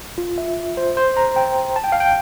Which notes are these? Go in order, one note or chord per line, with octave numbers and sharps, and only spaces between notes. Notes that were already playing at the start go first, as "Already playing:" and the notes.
F4
E5
C5
C5
A#5
G5
A5
G5
F5
G5